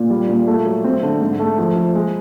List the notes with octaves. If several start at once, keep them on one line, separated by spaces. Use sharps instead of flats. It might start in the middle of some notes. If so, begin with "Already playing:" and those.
Already playing: A#2
G3
A#2
A3
F#3
C4
D3
G#2
A3
F2
F2
G#3